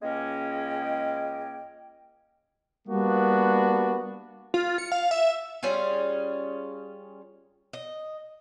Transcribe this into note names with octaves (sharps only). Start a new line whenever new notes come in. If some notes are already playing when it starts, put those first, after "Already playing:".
C#2 G#3 A#3 C#4 D#5 G5
G3 A#3 B3 D4 F#4
F4
C#7
F5
E5
G3 C#4 F4 G#4
D#5